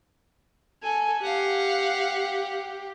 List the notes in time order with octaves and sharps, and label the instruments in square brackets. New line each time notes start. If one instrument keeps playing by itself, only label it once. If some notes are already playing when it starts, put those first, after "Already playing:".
[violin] A4 [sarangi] G#5
[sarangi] G4 [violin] F5 F#5